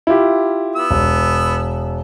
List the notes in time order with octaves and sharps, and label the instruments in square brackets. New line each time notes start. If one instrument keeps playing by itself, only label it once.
[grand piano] E4 F4 G4
[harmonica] B3 E6
[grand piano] E1